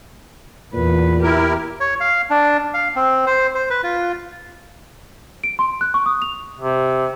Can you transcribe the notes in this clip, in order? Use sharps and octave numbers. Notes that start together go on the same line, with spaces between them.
E2 A#2 B4
E4 G4 A#4
C#5
F5
D4
F5
C4
C5
C5
B4
F4
D7
C6
F#6
C#6
D#6
F7
C3